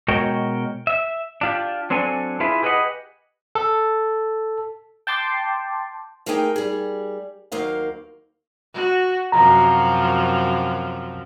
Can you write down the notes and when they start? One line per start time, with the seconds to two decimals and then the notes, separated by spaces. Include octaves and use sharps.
0.08 B2 G#3 F#4 A#4 C#5 G5
0.87 E5
1.41 D4 F4 G4
1.90 F#3 C4 D4 A4 G#5
2.40 E4 F4 G#4 B4 E5
2.62 G4 G#4 B4 D5 D#5 F#5
3.55 A4
5.07 G5 A5 C6 D6
6.26 A3 A#3 D#4 G#4 G5 G#5
6.56 G3 G#4
7.52 D#2 F#3 A#3 C5 F5
8.73 F#4
9.32 F#2 C3 F3 A#5